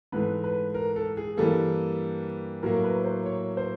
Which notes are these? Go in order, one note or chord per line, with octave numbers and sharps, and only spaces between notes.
G#2 E3 A3 B4
B4
A#4
A4
G#4
G2 E3 G3 A#3 A4
A2 F#3 A#3 A#4
B4
C5
C#5
C5